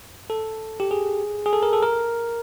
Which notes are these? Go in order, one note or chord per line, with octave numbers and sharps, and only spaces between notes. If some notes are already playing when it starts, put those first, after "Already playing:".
A4
G4
G#4
G#4
A4
A#4
A4
A#4